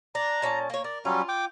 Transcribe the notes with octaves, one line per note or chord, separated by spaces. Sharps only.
D4 A#5
A#2 C#4 A5
A#3 C#5
A#4 D5
F#3 G3 C#4 F4
G5 D6